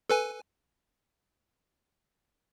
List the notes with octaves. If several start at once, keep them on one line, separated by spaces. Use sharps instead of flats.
A4 B4 G#5